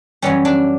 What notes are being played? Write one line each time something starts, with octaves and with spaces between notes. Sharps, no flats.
F#2 E3 G3 C#4
D4